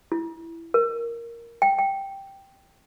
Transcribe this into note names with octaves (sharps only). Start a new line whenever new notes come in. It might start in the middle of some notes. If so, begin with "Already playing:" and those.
E4
A#4
G5
G5